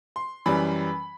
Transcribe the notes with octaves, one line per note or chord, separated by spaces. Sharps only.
C6
F#2 E3 G3 B5